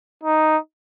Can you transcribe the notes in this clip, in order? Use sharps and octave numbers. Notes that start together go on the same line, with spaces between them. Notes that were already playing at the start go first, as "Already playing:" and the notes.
D#4